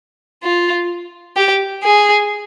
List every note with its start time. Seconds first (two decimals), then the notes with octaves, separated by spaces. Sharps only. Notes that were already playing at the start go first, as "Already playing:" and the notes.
0.43 F4
1.36 G4
1.84 G#4